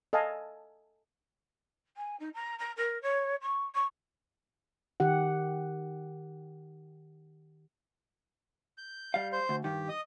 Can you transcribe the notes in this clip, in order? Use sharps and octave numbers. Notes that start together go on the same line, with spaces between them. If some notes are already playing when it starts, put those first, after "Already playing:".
A4 D#5 F5 G#5 A5
G#5
D#4
A#5
A#5
A#4
C#5
C#6
C#6
D#3 G4 F#5
G6
G3 F5
C5 G6
D2
G2 D#3 G4
D#5 D#6